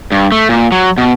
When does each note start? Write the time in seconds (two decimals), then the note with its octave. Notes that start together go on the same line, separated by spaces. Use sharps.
0.12 G2
0.32 A3
0.49 A#2
0.72 F#3
0.98 B2